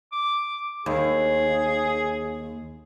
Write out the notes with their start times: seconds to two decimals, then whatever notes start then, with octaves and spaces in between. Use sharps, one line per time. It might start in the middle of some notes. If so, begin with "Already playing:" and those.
0.12 D6
0.86 D#2 G#4